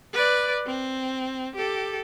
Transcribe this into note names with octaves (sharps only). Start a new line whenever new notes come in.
B4 D5
C4
G4 A4